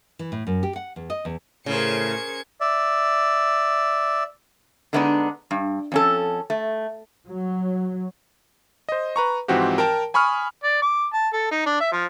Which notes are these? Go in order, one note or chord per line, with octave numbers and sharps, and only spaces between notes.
E3
A2
F#2
G4
F#5
E2
D#5
E2
A2 C#3 G#4 A#4 C5 G#6 C#7
D5 E5
D3 G#3 A3 B3 D4 D#4
G2
F2 C#4 A4
A3
F#3
C5 D#5
B4 A#5 C#6
G#2 E3 F3 C4 F#4 G4
A#4 G5 A5 A#5
G#5 B5 C#6 D#6 F6
D5
D6
A5
A4
D#4
D4
E5
F3